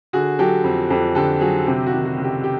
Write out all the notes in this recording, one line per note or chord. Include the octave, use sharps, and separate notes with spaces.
D3 F#4 G#4
F#3 G4 A4
F2
F2 G4 A4
D3 G4 A4
F#3 F#4 G#4
C3 G4
F#4
D#3
F#4
C#2
G4
G4